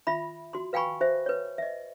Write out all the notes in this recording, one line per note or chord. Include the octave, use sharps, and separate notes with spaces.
F4 E5 B5
F#4 C6
B4 F5 G5 G#5 B5 C#6
F#4 C5 E5
B4 C#5
D#5 E5